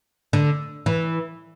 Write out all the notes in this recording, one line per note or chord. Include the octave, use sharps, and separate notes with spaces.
D3
E3